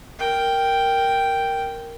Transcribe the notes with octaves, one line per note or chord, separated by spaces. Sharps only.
A#4 G5